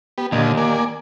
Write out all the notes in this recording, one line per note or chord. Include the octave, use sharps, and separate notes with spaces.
B3 G4
D#2 A#2 D3 D#5
A#3 D5 G#5